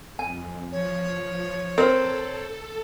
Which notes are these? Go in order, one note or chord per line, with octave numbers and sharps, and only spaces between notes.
F2 G#5
F3 C#5
C4 A4 A#4